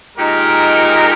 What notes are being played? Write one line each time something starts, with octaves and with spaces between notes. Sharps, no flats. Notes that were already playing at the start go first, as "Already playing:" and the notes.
A#2 G#3 D#4 G4 A#4